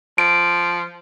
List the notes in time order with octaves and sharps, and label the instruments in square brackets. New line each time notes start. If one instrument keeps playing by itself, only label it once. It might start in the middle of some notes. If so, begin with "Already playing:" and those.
[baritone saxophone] F3 [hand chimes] D7